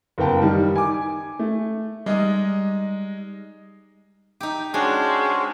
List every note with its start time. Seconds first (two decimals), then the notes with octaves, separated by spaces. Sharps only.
0.18 F#1 B3 A#4 G5 A5
0.42 D#3 G3
0.76 G#5 D6
1.39 A3
2.06 G3 G#3 D#4 D#5
4.40 D#4 G4
4.74 G#3 C#4 D4 F#4 C5